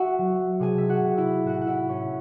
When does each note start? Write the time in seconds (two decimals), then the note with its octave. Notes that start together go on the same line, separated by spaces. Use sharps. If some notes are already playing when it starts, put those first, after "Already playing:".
Already playing: F#4 E5 F#5
0.18 F#3
0.60 C3 G#4 G#5
0.78 E5
0.89 F#4 F#5
1.04 C3
1.18 E4 E5
1.44 A2 F#4 F#5
1.61 F#5
1.67 E4 E5
1.89 A2 C#4 C#5